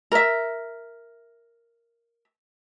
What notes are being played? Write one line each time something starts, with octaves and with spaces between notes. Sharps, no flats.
A#4 E5